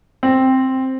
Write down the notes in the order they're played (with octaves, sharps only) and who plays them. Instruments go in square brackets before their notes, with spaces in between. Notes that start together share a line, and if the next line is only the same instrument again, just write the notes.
[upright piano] C4